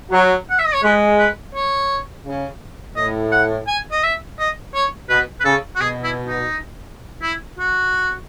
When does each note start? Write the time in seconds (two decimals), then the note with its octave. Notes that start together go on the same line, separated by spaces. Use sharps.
0.11 F#3 F#4
0.50 F#5
0.59 E5
0.66 D#5
0.74 C#5
0.83 G#3 B4
1.18 B4
1.55 C#5
2.25 C#3
2.96 A2 D#5
3.32 F#5
3.67 G#5
3.92 D#5
4.03 E5
4.39 D#5
4.74 C#5
5.09 B2 B4
5.40 B4
5.45 C#3 A4
5.76 F#4
5.80 B2 G#4
6.04 E4
6.28 D#4
7.22 E4
7.59 F#4